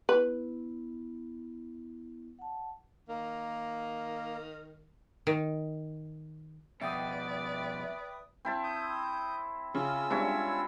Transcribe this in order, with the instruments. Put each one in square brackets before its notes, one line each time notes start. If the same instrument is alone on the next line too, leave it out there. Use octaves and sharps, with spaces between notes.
[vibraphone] B3 E4 [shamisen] B4
[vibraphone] F#5 A5
[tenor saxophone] D#3 [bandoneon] A#3
[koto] D#3
[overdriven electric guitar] F2 B2 [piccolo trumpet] B4 [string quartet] D5 [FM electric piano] E5 G5 D#6
[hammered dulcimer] C4 E4 A5
[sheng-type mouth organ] D#6 G6
[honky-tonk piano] C#3 [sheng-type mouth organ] C#4 F4 E6
[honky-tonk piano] G3 G#3 C4 [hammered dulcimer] D4 E4 C#5